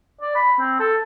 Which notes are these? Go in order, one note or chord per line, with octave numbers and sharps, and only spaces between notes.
D5
B5
C4
A4